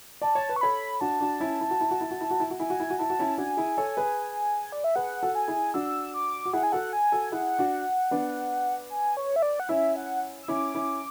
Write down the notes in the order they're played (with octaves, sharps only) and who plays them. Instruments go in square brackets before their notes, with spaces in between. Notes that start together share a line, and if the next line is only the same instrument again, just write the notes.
[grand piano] D5 [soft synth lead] A5
[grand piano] C#5
B4
[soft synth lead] C#6
[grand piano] A4 C#5 [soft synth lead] B5
[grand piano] D4 F#4 [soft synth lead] A5
[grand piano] D4 F#4
C#4 E4
E4
F#4
E4
F#4
E4
F#4
E4
F#4
E4
F#4
[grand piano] E4 [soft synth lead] G#5
[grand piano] F#4
E4
F#4
[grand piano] E4 [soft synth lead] A5
[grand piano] F#4
C#4 E4
[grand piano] D4 F#4 [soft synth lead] G#5
[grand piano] E4 G#4
A4 C#5
G#4 B4
[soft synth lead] D5
E5
[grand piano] G#4 B4 [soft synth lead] F#5
[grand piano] F#4 A4
[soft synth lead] G#5
[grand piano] E4 G#4
[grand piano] D4 F#4 [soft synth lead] E6
[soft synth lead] D6
[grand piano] F#4
[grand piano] E4 G#4 [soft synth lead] F#5
[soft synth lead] G#5
[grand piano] F#4 A4 [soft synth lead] F#5
[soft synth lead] G#5
[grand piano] F#4 A4
[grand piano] E4 G#4 [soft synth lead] F#5
[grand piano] D4 F#4
B3 D4
[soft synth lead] G#5
C#5
E5
D5
F#5
[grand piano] C#4 E4 [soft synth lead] E5
[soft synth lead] F#5
E6
[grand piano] C#4 E4 [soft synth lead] D6
[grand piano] C#4 E4